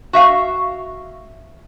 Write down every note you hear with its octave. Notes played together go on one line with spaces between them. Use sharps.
F#4 E5 F5